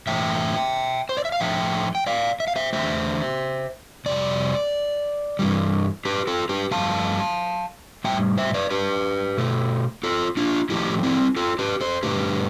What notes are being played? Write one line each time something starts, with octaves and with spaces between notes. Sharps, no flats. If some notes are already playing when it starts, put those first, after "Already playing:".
A2 E3 A3 E5 G5
C5
D5
E5
F5
A2 F3 A3 E5 G5
G5
D5 F5
E5
F5
C5 E5
E2 D3 A3 C5 E5
F2 C3 G3 D5
G2 E3 G3
G4 B4
F4 A4
G4 B4
G2 F3 A3 F5 A5
A2 G3 E5 G5
C5 E5
B4 D5
G4 B4
B2 A3
F4 A4
D4 F4
A2 F3 A3 E4 G4
C4 E4
F4 A4
G4 B4
A4 C5
G2 D3 A3 G4 B4